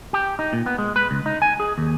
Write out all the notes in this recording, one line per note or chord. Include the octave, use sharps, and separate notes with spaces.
G4
D#4
A#2
B3
G#3
B4
C#2
D#4
G#5
G#4
D#2